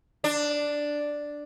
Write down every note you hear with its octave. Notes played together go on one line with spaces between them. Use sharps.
D4